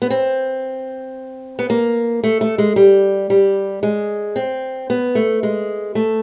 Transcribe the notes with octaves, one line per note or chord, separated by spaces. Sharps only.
B3
C4
B3
A#3
A3
A3
G#3
G3
G3
G#3
C4
B3
A3
G#3
A3